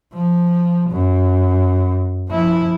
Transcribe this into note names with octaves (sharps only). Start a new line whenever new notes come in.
F3
F#2
F3 E4